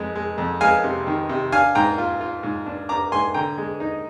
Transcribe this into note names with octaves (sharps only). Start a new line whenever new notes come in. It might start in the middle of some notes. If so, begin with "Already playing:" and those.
Already playing: F2 G#3
G#3
F2
G#3 F5 G#5
C3
D#3
C3
D4 F5 G#5
G#2 G5 A#5
F4
F4
G#2
D4
D4 A#5 D6
G#2 G#5 C6
D3 G5 A#5
G#3
D#4